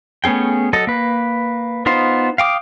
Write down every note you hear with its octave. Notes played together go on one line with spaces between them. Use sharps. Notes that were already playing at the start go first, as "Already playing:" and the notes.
A3 B3 C#4 G#4 G5
F#3 A4 D#5
A#3 B4
B3 D#4 F4 C5
F5 G5 D6 D#6